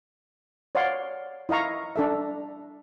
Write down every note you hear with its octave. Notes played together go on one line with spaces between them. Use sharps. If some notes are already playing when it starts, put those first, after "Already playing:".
C#5 D5 F5 F#5 C6
E4 D#5 F5 A#5 C#6
D4 A4 E5